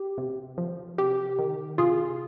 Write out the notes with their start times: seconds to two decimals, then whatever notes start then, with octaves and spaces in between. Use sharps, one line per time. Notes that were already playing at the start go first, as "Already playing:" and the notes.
Already playing: G4
0.18 C3
0.58 F3
0.98 C3 G4
1.39 D#3
1.78 C3 F4 G#4